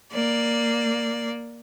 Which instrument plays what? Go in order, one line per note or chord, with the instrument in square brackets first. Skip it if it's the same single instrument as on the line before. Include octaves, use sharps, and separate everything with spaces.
[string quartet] A#3 D5